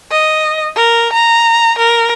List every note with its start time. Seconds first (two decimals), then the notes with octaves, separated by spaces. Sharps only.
0.11 D#5
0.76 A#4
1.13 A#5
1.79 A#4